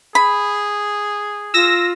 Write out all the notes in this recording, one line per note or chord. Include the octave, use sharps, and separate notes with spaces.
G#4 B5
F4 E6 A#6